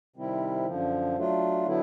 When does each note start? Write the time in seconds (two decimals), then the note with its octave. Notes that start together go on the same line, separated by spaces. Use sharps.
0.16 C3 D#3 G3 C4 E4
0.66 F#2 D3 F3
1.17 F#3 A3 D4 F4
1.66 D3 F#3 B3 E4